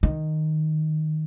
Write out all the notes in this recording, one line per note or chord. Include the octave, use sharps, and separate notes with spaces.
D#3